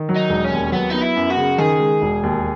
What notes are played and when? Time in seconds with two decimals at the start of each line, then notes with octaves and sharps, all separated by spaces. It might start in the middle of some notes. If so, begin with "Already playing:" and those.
Already playing: D#3
0.09 F#3
0.16 D#4
0.29 E1
0.44 C#4
0.51 D#2
0.72 F#3 B3
0.90 B3 D#4
1.01 E4
1.16 F#2
1.30 F#4
1.37 C#3
1.58 D#3 G#4
1.79 G#3
2.02 E1
2.23 D#2